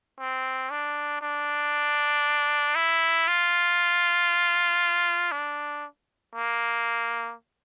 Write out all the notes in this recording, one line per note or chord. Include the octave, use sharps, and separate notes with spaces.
C4
D4
D4
E4
F4
D4
A#3